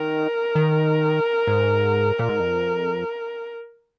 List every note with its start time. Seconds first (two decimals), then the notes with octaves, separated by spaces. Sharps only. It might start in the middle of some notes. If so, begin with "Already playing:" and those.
Already playing: D#3 A#4
0.55 D#3
1.47 G#2
2.19 A#2
2.29 G#2
2.40 F2